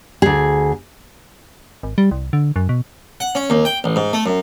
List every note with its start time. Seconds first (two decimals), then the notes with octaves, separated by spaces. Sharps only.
0.22 D2 G#4
1.83 G#1
1.98 G3
2.11 C2
2.33 D3
2.56 F#2
2.69 B2
3.20 F#5
3.35 C#4
3.50 D#2
3.65 G5
3.84 A1
3.96 G#2
4.13 A3
4.26 F#2